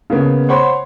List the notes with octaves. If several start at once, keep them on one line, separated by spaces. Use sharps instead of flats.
C#3 A#3 B3
C5 C#5 F#5 B5 C6